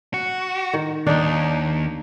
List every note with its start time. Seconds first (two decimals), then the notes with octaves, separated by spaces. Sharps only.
0.14 F#4
0.73 D#3
1.07 D#2 D4 D#4